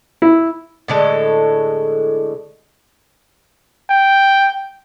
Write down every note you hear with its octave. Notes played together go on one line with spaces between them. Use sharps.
E4
A2 D3 G#3 A4
G5